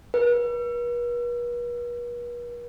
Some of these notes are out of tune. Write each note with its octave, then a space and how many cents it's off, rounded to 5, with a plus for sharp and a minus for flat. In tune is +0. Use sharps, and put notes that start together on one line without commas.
B4 -45